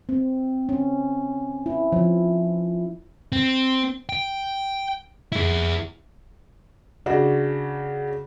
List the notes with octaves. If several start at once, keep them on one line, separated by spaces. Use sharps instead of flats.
C4
C#4
E4
F3
C4
G5
E4 G#4
C#3 D4 F#4